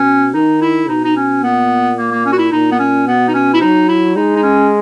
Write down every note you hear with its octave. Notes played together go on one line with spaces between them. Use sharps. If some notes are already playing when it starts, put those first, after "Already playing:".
Already playing: B2 C#4
D#3 D#4
E4
B2 D#4
D#4
C#4
A#2 B3
A#3
A#3
C#4
F#4
E4
A#2 D#4
B3
C#4
B2 B3
D#4
C#4
E4
F#3 D#4
E4
G#3 D#4
D#4
C#4